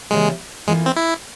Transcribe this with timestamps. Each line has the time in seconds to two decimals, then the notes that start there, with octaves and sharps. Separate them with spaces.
0.10 C#3 E3 G3 G#3 A#3
0.67 F2 E3 G#3 A#3 F4 C5
0.86 C4
0.96 E4